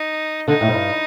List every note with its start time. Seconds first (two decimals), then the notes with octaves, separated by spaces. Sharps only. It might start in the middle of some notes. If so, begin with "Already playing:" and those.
Already playing: D#4
0.48 D3 D#4
0.61 A2
0.69 G#2
0.74 G2